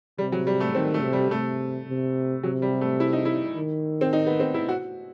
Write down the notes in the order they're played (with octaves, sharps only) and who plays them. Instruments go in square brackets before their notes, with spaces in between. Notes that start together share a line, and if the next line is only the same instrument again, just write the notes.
[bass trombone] C3 [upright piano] G3
[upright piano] F#3
G3
A3
[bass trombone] D#3 [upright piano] C4
[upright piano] A3
[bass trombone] C3
[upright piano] G3
[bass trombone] C3 [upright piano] A3
[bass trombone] C3
[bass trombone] C3 [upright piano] F#3
[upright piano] G3
A3
E4
D#4
E4
[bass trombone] D#3
[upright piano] C4
D#4
B3
C4
E4
F#4